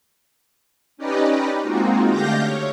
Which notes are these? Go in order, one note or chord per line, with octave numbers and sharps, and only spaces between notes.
C#4 D#4 G4 B4 D5 D#5
G#3 A#3 C4 D#4 F4 F#4
D3 A3 G4 F5 G6 A#6
C#5